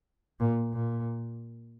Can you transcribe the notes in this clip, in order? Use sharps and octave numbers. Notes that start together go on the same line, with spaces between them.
A#2
A#2